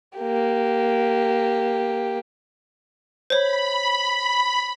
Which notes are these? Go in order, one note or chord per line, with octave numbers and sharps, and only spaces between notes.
A#3 G4
C5 C#5 B5